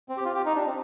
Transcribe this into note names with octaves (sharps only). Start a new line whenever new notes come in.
C4
G4
F4
G4
D#4
D4
C4